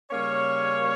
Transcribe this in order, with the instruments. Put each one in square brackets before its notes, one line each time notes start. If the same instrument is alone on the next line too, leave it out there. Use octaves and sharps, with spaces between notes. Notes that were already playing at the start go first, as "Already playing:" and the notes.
[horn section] C#3 G3 A#3 C#4 C#5